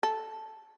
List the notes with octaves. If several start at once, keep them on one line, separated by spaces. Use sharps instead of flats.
A4